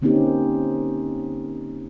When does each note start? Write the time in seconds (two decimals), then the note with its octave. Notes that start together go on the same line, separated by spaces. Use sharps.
0.02 D3 A#3 C4 C#4 D#4 G4